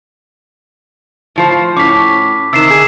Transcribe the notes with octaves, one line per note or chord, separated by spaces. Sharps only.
A2 F3 C5
A2 C#4 D6 B6
C3 D#3 E6 C7 E7
G#4